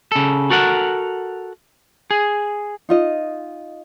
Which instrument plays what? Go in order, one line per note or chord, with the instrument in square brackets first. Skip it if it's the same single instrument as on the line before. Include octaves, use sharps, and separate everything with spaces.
[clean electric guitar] C#3 A4
F#4 A4 A#4 F#5
G#4
[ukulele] D#4 F4 D#5